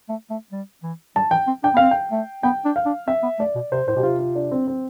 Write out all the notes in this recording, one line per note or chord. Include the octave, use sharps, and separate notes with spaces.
A3
A3
G3
E3
G3 A5
E3 G5
C4
D4 G5
B3
C4 F5
G5
A3
B3 G5
D4
F5
D4
C4 E5
B3
A3 D5
B2
C3 C5
A2 C5
B2 G4
C3 F4
F4
D4
C4
C4